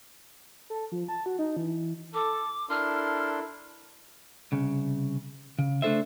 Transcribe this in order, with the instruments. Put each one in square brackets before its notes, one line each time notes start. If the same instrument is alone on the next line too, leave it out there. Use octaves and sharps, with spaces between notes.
[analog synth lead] A4
F3
A5
F#4
D#4
E3
[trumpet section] A4 [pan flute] D6
[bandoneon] D4 C6 [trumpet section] E4 A4 A#4 [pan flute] F6
[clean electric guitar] C2 C#3
C#3
A3 D4 F4 A4 C5 E5